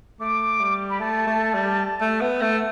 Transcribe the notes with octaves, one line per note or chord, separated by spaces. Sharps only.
A3 D6
G3
B5
A3 A5
A3
G3
A3
B3
A3